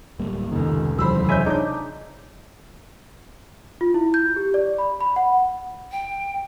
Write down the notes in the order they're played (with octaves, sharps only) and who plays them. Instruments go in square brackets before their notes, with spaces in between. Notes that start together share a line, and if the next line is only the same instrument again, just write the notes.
[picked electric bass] D1 G3 A#3
[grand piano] F1 C#2 [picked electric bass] D#3
[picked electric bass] D#2 E3 F#3 [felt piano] C5 B5 E6
[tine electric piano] C5 E5 G#5 [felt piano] C#5 D#5 G6
[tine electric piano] D4 D#4 G#4 [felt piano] D6 G6
[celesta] F4
E4
G6
G4
D5
B5
B5
F#5
[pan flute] G5